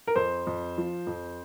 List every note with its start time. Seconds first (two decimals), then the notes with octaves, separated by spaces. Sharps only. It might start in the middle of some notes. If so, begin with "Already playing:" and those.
0.07 A#4
0.16 F2 C5
0.47 F2
0.78 F3
1.07 F2